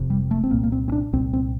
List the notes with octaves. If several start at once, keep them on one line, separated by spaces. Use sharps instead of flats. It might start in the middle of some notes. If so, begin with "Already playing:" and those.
Already playing: F1 F2 C3
G3
A3
C4
C2 A#2 A#3
A#3
C4
C4
D4
C2 A#2 C4
C4